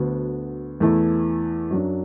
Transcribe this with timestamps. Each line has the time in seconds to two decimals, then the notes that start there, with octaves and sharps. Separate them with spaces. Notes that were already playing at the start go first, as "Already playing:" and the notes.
Already playing: D2 D3 B3 F#4
0.80 E2 E3 A3 E4
1.71 F#2 F#3 D4